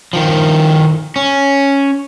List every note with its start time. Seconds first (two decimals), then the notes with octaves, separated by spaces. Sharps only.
0.13 D#3 F3
1.16 C#4